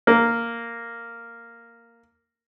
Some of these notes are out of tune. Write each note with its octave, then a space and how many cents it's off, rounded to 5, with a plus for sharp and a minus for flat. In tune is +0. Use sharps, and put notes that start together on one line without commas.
A#3 -5